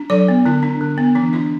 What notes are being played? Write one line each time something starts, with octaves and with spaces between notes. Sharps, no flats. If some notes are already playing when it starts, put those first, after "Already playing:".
Already playing: D4
F#3 A4 D5
B3
D3 E4
D4
D3
B3
E3 D4
D4 E4